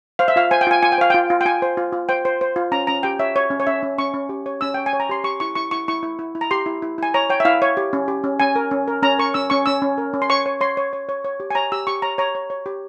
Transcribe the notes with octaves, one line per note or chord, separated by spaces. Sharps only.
C5 F5
E5
F4 F5
C5 G#5
G5
F4 G#5
F4 G#5
G5
C5 F5
F4 G5
F4
G5
F4 G#5
C5
F4
F4
C5 G5
C5
C5
F4
C#4 A#5
C#4 A#5
G4 G5
C#5 E5
C#5
C#4
C#5
C#4 E5
C#4
C#4 C#6
C#4
G4
C#5
C#4 E6
C#5 G5
G#5
C#5
A#5
G4 C6
G4 C#6
E4 C#6
E4 C#6
E4 C#6
E4 C#6
E4
E4
E4
A#5
G4 C6
E4
E4
E4 G#5
C#5 A#5
C#5 G5
E5
E4 F5
C#5
G4
C#4
G4
C#4
C#4 G#5
A#4
C#4
A#4
C#4 A#5
A#4 C#6
C#4 E6
C#4 C#6
C#4 E6
C#4
A#4
C#4
C6
C#5 C#6
C#5
C#5 C6
C#5
C#5
C#5
C#5
G4
G#5
C#5 A#5
G4 E6
G4 C#6
C#5 A#5
C#5 A#5
C#5
C#5
G4